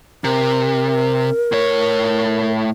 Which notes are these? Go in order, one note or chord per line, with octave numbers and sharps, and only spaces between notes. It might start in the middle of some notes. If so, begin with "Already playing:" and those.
C3 A#4
A2 C#5